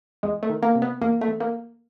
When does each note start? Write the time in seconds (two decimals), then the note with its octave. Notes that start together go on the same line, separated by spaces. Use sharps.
0.23 E2 G#3
0.43 A3
0.50 D#3
0.63 A#3
0.75 C3
0.82 B3
1.02 E2 A#3
1.21 A3
1.28 E2
1.40 A#3